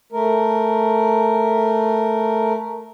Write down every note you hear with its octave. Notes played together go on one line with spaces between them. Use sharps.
A3 A#4